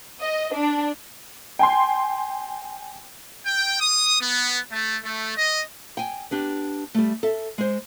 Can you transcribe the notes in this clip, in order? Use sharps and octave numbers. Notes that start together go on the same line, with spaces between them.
D#5
D4
G5 G#5 C6
G5
D#6
B3
A3
A3
D#5
G5 G#5
B3 D4 G4
G3 A3
A4 E5
G#3 C5